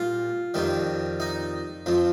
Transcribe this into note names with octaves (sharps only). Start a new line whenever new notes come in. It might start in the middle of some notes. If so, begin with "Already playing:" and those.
Already playing: A#2 G3 F4
F2 D#3 G3
D#4
F2 F3